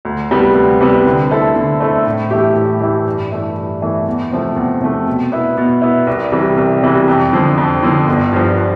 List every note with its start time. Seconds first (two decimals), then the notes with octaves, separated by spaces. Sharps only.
0.05 D2
0.31 C3 G3 B3
0.55 D2
0.80 C3 G3 B3
1.06 D3
1.31 A3 C4 E4 A4
1.56 D3
1.80 A3 C4 E4 A4
2.06 A2
2.31 E3 A3 E4 G4
2.55 A2
2.80 E3 A3 E4 G4
3.06 G2
3.32 E3 A3 E4
3.57 G2
3.82 E3 A3 E4
4.07 E2
4.31 C3 F3 A3
4.56 E2
4.81 C3 F3 A3
5.07 B2
5.32 B3 E4
5.57 B2
5.82 B3 E4
6.07 C2
6.32 C3 E3 G3
6.57 C2
6.83 C3 E3 G3
7.08 F2
7.33 D3 F3
7.58 F2
7.83 D3 F3
8.08 G1
8.33 G2 F3